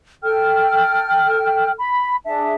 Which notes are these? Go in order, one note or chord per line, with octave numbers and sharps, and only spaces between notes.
A4 G5 F6
B5
D4 G#4 E5 A5